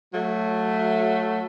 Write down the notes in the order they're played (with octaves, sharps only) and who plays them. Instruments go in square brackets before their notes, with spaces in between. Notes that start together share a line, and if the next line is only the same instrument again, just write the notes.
[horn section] F#3 A3